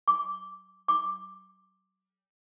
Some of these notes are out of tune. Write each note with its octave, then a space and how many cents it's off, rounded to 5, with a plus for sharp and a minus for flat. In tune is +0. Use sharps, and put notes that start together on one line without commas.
D6 -10
D6 +5